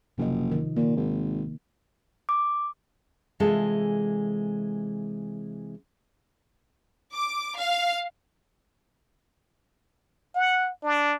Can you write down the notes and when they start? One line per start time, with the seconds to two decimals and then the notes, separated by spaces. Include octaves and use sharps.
0.18 F#1 C3 F3 D#5
0.52 D#3
0.76 A#2 D#3 A#3
0.96 G#1
2.29 D6
3.40 C3 E3 G#3 F4 G#4 A4
7.14 D6
7.57 F5
10.35 F#5
10.84 D4